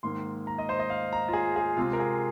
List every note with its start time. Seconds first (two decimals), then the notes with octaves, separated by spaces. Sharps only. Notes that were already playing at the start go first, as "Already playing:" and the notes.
0.03 G#2 D#3 A#3 C6
0.47 A#5
0.58 D#5
0.69 C5
0.79 D#5
0.90 F5
1.13 A#5
1.28 F4
1.33 G#4
1.56 G#4
1.77 C3 G#3 C4 F4
1.93 A#4
2.00 G#4